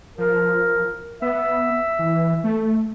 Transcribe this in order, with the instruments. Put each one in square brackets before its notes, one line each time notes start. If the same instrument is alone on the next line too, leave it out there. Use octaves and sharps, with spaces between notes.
[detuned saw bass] F3 [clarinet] A#4
[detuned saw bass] B3 [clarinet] E5
[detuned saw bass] E3
A3